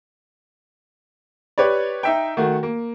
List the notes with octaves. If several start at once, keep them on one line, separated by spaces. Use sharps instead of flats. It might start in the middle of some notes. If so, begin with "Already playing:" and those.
G4 B4 C#5 D5
D#4 E5 G5
D#3 A3 F#4
A#3